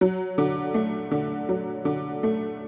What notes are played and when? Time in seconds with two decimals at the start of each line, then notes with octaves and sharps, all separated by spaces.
0.01 F#3
0.38 D3
0.74 A3
1.11 D3
1.49 F#3
1.85 D3
2.23 A3